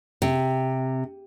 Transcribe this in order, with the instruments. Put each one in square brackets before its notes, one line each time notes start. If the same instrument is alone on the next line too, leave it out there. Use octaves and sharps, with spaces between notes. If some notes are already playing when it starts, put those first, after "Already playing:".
[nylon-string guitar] C3